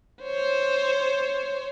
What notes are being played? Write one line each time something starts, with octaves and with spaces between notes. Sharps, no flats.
C5 C#5